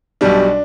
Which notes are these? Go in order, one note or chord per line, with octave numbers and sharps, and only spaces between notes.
B1 B2 G3 D4